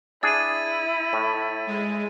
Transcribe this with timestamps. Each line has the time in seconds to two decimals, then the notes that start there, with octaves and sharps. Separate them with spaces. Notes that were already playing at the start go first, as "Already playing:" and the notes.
0.23 D4 E4 G#4 A6 D#7
1.13 A2
1.66 G#3